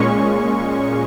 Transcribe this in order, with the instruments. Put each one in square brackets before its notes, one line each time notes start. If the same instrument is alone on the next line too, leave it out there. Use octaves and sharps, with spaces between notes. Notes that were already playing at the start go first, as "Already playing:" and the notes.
Already playing: [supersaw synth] A#2 G#3 C#4 C#6